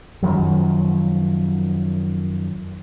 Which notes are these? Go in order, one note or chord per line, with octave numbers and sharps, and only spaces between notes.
F#2 D#3 F3 F#3